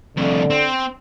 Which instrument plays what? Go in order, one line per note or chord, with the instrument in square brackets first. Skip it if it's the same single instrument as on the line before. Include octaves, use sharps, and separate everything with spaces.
[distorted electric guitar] C2 F2 [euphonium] D3
[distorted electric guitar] C4